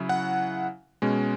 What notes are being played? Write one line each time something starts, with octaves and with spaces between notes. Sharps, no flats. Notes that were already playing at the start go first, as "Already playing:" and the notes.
Already playing: C#3 F#3 E4
F#5
B2 G#3 C#4